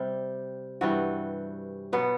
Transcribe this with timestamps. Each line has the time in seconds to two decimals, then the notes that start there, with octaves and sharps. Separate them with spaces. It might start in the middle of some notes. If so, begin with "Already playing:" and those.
Already playing: C3 G3
0.81 G2 E3 G3 F#4
1.93 B2 F#3 B3